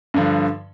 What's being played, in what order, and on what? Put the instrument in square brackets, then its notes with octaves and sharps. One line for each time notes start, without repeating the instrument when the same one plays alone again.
[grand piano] G2 D3 F3